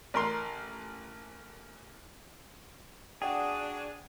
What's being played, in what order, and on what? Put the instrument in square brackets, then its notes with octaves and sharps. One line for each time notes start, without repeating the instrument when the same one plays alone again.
[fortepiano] A1 A#4 C6
[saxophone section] D4 [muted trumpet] F#4 [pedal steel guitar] G#4 [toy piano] F#5 G5